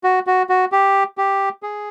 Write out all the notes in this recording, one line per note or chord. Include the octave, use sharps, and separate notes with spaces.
F#4
F#4
F#4
G4
G4
G#4